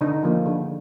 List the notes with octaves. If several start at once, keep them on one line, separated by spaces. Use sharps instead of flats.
D3 D#4
F3 A#3
D3